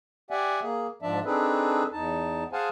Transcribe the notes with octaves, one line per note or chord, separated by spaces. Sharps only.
G4 D5 E5 F#5 G#5
A#3 G#4
G#2 F3 D4 D5 E5 A5
C4 D4 D#4 G#4 A4 B4
E2 D#4 A5
G#4 C5 F5 F#5 G#5 A5